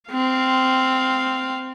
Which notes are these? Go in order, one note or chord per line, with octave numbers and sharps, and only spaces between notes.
C4 F5